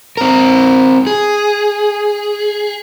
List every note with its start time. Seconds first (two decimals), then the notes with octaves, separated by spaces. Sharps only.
0.17 C4 A#4
1.07 G#4